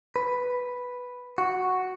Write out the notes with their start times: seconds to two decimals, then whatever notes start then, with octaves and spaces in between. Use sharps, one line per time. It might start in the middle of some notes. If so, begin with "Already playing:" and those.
0.16 B4
1.38 F#4